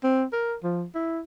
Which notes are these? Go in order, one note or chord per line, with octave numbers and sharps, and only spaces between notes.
C4
A#4
F3
E4